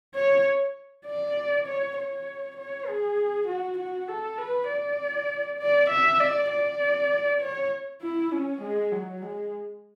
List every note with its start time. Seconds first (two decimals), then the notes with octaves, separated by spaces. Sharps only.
0.15 C#5
1.06 D5
1.66 C#5
1.96 C#5
2.57 C#5
2.87 G#4
3.47 F#4
3.78 F#4
4.08 A4
4.38 B4
4.68 D5
5.59 D5
5.90 E5
6.20 D5
6.50 D5
7.41 C#5
8.01 E4
8.32 C#4
8.61 G#3
8.91 F#3
9.22 G#3